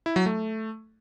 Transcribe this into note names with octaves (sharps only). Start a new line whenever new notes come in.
E4
F#3
A3